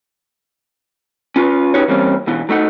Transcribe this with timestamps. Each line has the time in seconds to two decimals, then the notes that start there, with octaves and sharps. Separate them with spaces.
1.36 C#4 F4 B4
1.74 C#4 D#4 F#4 G4 B4 C#5
1.88 E3 G3 A#3 C4 C#4
2.27 B1 B2 E3
2.49 F#3 A3 D#4 F#5